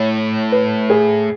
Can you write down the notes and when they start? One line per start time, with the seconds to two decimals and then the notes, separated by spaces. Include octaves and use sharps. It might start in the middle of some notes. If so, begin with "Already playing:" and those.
Already playing: A2 C#5
0.52 B4
0.90 G#4